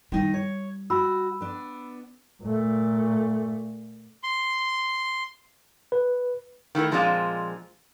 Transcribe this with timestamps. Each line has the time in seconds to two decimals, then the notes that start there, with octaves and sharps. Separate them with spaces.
0.12 D#3 G3 D#4
0.34 C#5
0.90 F#4 B5 E6
1.41 B3 D4
2.43 A#2 A3
4.23 C6
5.92 B4
6.75 D#3 A3 E4 A#4
6.91 A#2 F3 G#3 C4 D4 F4